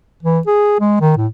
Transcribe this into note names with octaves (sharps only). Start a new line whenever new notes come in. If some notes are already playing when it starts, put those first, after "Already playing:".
E3
G#4
G#3
D#3
A2